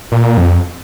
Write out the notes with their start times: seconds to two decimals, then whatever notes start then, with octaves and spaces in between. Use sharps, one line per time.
0.12 A#2
0.37 F2